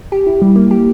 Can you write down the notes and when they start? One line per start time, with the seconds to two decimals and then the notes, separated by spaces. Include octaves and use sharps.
0.12 G4
0.27 E4
0.42 G3
0.56 A#3
0.71 G4